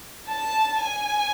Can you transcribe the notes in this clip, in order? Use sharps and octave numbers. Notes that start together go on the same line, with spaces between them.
A5
G#5